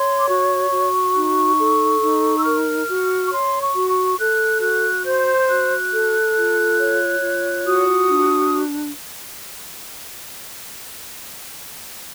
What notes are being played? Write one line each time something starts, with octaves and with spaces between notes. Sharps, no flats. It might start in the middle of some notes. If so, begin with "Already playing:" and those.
Already playing: C#5 C6
D6
F#4 C#6
F#4
D#4
A4
D#4
E6
A#4 F6
F#4
C#6
C#5 C6
C#6
F#4
C#6
A4 F#6
F#4 F#6
C5 G6
F#4 F#6
A4
F4
C#5
F4
F#4 D#6
D4